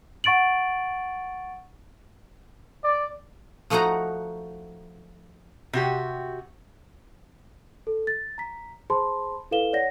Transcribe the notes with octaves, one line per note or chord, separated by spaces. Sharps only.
F#5 C#6 A6 D7 F#7
D5
F3 A3 D#4 F#4 F#5 A#5
C3 F#4 G4
A4
A6
A#5 B6
G#4 C5 A5 B5 C6
E4 A4 B4 F5 E7 G7
C#5 D5 F#5 A#6